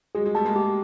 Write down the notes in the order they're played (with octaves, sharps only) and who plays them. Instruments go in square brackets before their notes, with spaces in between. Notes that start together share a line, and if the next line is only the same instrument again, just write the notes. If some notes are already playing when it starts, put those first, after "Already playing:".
[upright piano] F#3 G#3 [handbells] G#4
[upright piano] F#3 G#3
[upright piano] G3 A3 [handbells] A5
[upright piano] G#3 A#3
[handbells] G4